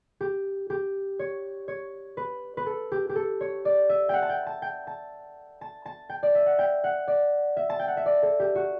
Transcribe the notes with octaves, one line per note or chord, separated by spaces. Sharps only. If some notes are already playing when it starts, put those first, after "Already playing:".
G4
G4
C#5
C#5
B4
B4
A4
G4
G4
A4
C#5
D5
E5
F#5 G5
A5
G5
A5
G5
A5
A5
A5
G5
D5
E5
F#5
G5
F#5
D5
E5
A5
G5
F#5
E5
D5
A4
G4
F#4